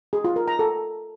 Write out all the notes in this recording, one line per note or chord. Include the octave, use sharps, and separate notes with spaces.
G#4
F4
A#4
A#5
A4